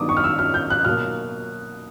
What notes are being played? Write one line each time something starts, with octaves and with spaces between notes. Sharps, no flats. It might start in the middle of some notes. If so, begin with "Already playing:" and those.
Already playing: G2 D#3 F#3 B3 D#4 D6 D#6
C#6
F6
E6
F6
G6
F#6
B2 F#3 A#3 F6